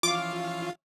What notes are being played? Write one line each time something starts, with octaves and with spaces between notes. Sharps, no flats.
E3 F3 C#4 F4 F5 D6